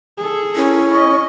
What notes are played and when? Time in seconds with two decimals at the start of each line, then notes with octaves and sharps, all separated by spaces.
0.18 G#4 A4
0.56 C#4 E4 A#4
0.92 D#5 C#6